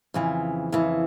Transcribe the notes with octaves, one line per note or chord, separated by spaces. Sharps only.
F2 C#3 E3
F2 C#3 E3